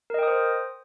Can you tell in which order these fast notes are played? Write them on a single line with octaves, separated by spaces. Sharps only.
A#4 D#5 G5 D#6 C5